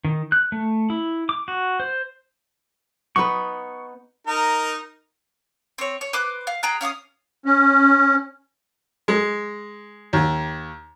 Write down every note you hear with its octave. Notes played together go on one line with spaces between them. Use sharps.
D#3
F#6
A3
E4
D6
F#4
C5
B3 D#4 B4 C#6
D#4 A#4
C4 C#5
C#5
B4 C5 D6 F#6
F5
G#4 G5 A#5 F#6
C#4 F5 D6 D#6
C#4
G#3
D#2